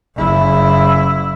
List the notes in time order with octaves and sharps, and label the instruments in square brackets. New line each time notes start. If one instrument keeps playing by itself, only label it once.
[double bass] F#1 E4